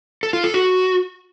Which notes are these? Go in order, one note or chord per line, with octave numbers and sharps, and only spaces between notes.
A4
F4
A4
F#4